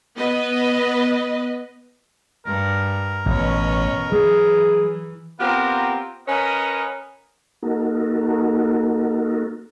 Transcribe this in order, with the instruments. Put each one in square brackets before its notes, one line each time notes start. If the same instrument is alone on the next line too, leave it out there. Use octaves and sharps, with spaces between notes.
[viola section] B3 B4 D#5
[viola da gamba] G2 [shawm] A#4
[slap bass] A1 [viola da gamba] B2 C#4 C#5
[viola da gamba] E3 [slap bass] F#3 [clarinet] G#4
[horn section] B3 C4 F4 G4 A#4
C#4 A#4 B4 C#5 D#5 F#5
[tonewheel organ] A#3 D#4 F#4 A4 A#4